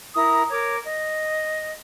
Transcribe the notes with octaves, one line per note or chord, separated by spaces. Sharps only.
E4 A#4 A#5 D#6
A#4 C#5 D6
D#5